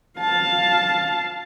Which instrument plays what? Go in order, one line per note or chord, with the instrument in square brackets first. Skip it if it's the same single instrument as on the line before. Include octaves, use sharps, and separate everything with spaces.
[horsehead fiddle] F5 A5